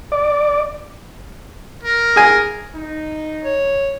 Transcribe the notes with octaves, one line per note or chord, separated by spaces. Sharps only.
D5
A#4
G#4 G#5
D#4
C#5